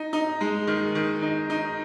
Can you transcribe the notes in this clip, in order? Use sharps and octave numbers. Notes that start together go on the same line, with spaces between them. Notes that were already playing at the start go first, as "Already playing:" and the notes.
Already playing: D#4
D#4
G#3
D#3
D#3
D#4
D#4